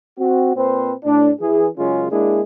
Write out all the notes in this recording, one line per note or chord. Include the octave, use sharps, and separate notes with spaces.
C4 F#4
A#2 C4 B4 C5
A2 D4
E3 G#4
F#2 C#3 G#3 C#4 F4
G#3 A#3 D4 E4 G#4